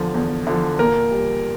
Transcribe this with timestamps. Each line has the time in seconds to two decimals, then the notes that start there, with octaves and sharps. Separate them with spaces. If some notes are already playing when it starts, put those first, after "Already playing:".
Already playing: E2 D3 F3
0.14 E2
0.47 D3 F3
0.79 A#2 A#4
1.11 G3